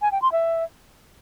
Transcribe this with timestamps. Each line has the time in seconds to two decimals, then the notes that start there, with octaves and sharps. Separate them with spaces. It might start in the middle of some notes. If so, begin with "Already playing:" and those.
0.02 G#5
0.12 G5
0.22 C6
0.32 E5